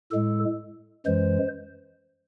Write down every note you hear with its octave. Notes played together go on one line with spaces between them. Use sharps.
A2 G#3 A4
F#2 E3 G#3 C5